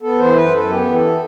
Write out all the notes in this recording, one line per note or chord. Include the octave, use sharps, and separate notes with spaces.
B3 A4
E3 C5
F#2 B4
F#2 A4
B3 G4
E3
A4